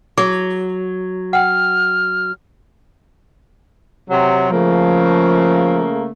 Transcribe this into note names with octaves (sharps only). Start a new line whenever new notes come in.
F#3 G#4
F#5 G5 F6
C3 F#3
C#3 F3 A3 A#3